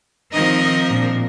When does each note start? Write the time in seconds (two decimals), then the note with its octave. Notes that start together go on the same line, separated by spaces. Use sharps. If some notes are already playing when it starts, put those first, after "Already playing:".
0.33 D#3 F3 C4 D#4 A#4 D#5
0.88 A#2 A#3 D4